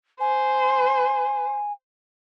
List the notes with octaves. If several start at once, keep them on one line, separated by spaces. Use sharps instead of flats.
C5 G#5